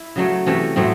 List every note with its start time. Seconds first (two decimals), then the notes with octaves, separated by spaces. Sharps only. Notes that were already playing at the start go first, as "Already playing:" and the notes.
Already playing: E4
0.16 C#3 F#3 A3
0.46 C3 E3 A3 C#4
0.76 A2 F#3 A3 C4